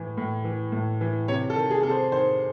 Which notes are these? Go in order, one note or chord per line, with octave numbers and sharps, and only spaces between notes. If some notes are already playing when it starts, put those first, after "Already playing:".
Already playing: A2 E3
A2
E3
A2
E3
C3 C#5
A4
D#3
G#4
C3 A4
C5
D#3 C5